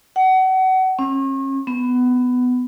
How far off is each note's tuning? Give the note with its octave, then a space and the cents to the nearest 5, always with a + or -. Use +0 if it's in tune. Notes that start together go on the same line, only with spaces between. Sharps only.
F#5 +30
C#4 -40
B3 +15